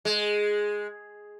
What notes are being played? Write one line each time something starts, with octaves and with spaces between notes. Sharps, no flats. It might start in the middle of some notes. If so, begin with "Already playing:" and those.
G#3